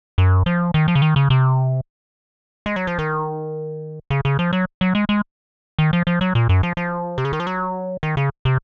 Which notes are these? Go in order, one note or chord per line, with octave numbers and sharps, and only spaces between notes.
F#2
F3
D#3
F3
C#3
D#3
C#3
C3
G#3
F#3
F3
D#3
C#3
C#3
F3
F#3
F#3
G#3
G#3
D#3
F3
F3
F#3
A#2
F#2
F3
F3
C3
C#3
D#3
F3
F#3
D#3
C#3
C3